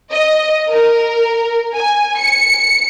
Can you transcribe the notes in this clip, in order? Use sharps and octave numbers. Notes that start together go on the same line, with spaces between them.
D#5
A#4
G#5
C#7